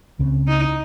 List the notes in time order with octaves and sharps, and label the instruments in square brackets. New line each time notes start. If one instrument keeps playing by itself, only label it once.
[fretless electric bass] C#2 C#3 A3 C4
[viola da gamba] D#4